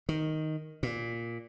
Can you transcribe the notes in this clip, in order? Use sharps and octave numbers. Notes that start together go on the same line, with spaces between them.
D#3
A#2